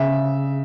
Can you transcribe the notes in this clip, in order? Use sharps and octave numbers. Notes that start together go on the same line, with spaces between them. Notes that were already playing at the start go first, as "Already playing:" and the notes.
Already playing: C#3 E5